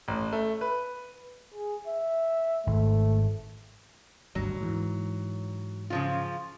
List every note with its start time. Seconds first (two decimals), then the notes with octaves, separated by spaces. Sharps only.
0.08 A1
0.32 A3
0.61 B4
1.54 G#4
1.87 E5
2.67 G#1 A3
4.35 G#1 D2 G2 F#3
4.60 G#2 E3
5.90 C#3 F3 F4